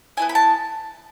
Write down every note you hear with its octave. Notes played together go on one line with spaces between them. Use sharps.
B3 E4 A4 G#5
B5
A5